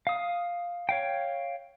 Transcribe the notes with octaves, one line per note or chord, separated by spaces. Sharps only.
F5 D#6
C#5 F5 G5